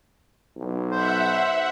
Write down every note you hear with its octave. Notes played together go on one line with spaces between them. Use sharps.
B1
C5 E5 F#5